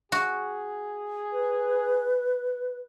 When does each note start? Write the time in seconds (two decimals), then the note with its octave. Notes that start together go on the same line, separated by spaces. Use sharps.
0.12 F#4 G#4
1.32 B4